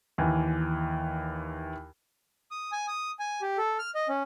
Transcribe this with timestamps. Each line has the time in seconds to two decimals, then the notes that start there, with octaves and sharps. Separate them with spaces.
0.18 D#2 E3 G#5
2.51 D#6
2.72 G#5
2.88 D#6
3.19 G#5
3.42 G4
3.58 A4
3.79 F6
3.95 D#5
4.09 C#4